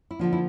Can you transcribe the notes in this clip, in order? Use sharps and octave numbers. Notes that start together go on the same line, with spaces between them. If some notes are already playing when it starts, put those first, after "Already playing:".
E4
D3 F3 A#3 D4
E4